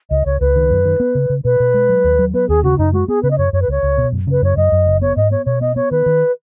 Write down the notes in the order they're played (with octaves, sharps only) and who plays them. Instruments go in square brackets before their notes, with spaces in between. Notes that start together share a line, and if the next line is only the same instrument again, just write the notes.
[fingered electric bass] C#2 [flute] D#5
[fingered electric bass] C#2 [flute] C#5
[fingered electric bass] C#2 [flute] B4
[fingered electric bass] D#3
F#2
D#3
B3
C#3
C#3
[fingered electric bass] B2 [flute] B4
[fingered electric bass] B2
G#3
F#3
D#2
F#3
[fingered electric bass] B3 [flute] B4
[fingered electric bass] D#2 [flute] G#4
[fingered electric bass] C#3 [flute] F#4
[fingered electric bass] F#2 [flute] D#4
[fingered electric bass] G#3 [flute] F#4
[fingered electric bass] B3 [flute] G#4
[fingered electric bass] C#3 [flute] B4
[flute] D#5
[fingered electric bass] F#2 [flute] C#5
[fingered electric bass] F#2 [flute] C#5
[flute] B4
[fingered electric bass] C#2 [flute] C#5
[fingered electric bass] C#2
B2
F#2
[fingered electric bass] C#3 [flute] B4
[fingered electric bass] F#2 [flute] C#5
[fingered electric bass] F#2 [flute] D#5
[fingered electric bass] F#2
F#1
[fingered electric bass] B3 [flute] C#5
[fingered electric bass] G#2 [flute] D#5
[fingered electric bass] B3 [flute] C#5
[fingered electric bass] B2 [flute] C#5
[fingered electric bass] B3 [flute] D#5
[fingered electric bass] B3 [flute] C#5
[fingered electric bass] D#3 [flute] B4
[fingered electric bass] D#3